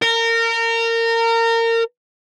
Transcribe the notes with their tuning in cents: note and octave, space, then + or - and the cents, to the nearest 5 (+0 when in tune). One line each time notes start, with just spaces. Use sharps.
A#4 -25